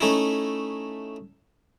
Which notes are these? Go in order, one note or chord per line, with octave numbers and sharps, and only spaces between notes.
A3 C#4 D#4 E4